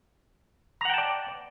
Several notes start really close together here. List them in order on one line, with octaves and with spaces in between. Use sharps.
A#5 F#5 G5 A5 D5